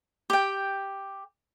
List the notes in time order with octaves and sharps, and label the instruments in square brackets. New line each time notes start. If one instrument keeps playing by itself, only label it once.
[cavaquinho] G4 G5